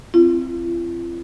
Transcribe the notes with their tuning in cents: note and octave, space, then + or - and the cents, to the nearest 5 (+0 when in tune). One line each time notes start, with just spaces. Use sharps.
C4 +0 F4 -45